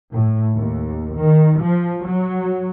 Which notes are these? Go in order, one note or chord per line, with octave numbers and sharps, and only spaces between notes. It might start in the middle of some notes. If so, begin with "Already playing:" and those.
A2
D#2
D#3
F3
F#3